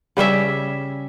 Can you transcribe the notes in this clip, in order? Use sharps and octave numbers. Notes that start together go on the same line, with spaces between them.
C#3 G3 C#4 E5